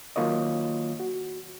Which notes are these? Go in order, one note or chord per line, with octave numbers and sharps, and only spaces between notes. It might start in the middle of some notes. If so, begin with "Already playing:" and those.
D#3 F#3 A#3 F4 C#5 D#5
F#4